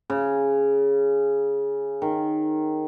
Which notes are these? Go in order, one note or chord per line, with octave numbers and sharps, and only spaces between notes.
C#3
D#3